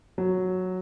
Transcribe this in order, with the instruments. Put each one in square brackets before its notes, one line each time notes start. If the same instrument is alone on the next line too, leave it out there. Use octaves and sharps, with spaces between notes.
[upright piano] F#3